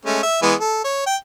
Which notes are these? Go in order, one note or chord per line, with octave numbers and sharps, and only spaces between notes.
G#3 A3 C#4
E5
E3 G#3 B3
A4
C#5
G5